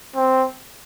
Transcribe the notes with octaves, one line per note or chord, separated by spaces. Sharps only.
C4